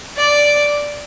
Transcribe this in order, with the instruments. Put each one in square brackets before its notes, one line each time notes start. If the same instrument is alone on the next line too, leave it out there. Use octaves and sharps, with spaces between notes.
[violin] D5